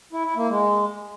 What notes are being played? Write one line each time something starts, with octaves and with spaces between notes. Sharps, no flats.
E4
E4
A#3
G#3